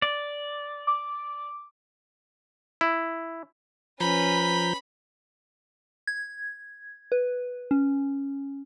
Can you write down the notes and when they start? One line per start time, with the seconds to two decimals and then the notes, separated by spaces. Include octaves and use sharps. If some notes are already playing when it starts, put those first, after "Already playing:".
0.02 D5
0.87 D6
2.81 E4
4.01 F3 C#4 B4 A#5 B5 G6
6.07 G#6
7.12 B4
7.71 C#4